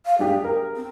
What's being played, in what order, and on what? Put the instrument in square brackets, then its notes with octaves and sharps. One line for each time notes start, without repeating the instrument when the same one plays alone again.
[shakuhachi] F5
[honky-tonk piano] G3 D4 G4 [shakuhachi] G#4
[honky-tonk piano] A#4
[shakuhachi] C4